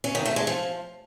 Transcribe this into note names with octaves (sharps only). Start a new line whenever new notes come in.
C#4
D#3
A3
G#3
F3